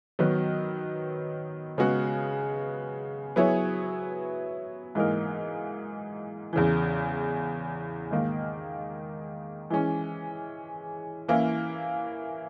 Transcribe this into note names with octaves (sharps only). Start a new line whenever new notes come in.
D#3 F#3 B3 F#4
C#3 G#3 B3 F#4
F#3 B3 E4 G#4 C#5
G#2 E3 A#3 D#4 A#4
E2 C#3 E3
G#2 D#3 A#3
E3 G#3 C#4
E3 A#3 C#4 E4